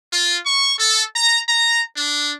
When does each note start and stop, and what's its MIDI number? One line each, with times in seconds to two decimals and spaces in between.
0.12 0.38 65
0.46 0.75 85
0.80 1.04 69
1.15 1.41 82
1.49 1.82 82
1.97 2.34 62